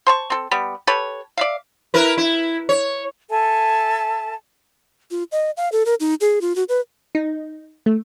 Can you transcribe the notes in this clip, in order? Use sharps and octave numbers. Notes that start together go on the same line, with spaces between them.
C5 A5 C#6
C4 A4
G3 B3 G4
G4 A4 B4 C#5
D5 E5 F5
E4 A#4 B4
E4
C#5
A4 E5 G#5 A5
F4
D#5
F5
A4
A#4
D#4
G#4
F4
F#4
B4
D#4
A3